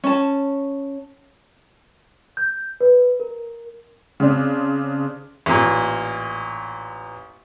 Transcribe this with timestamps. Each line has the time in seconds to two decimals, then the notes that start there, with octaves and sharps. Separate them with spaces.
0.04 C#4 A5
2.37 G6
2.81 B4
3.20 A#4
4.20 C#3 C4 D4
5.46 A1 A#2